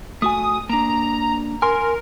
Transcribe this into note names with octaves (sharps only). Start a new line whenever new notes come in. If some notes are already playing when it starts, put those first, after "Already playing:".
A3 F#4 G#5 D#6
A#3 D4 A#5
A#4 G#5 C6